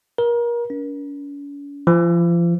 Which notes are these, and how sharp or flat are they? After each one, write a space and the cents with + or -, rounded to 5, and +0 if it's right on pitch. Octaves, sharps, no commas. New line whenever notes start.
A#4 +30
C#4 +45
F3 -35